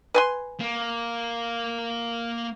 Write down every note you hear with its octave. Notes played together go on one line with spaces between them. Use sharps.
B4 G#5 C6
A#3